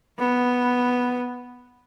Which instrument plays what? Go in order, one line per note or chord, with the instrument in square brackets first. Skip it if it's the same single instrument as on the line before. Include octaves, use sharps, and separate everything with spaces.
[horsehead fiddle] B3